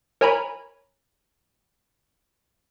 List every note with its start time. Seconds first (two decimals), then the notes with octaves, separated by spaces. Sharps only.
0.21 A#4 C#5 G#5 A#5 B5